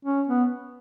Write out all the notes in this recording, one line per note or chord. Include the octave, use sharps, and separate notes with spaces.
C#4
B3